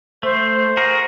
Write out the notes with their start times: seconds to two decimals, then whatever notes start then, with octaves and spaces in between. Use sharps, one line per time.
0.23 A3 C5
0.77 F#4 G#4 A#4